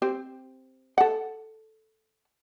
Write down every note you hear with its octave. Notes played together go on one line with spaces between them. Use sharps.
C4 G4 C5
A4 F#5